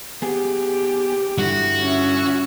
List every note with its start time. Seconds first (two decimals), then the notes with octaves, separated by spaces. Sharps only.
0.22 B3 G4 G#4
1.38 G2 D3 E4 F#4
1.81 C#4 E5